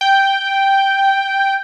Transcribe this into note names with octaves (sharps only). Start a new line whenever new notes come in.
G5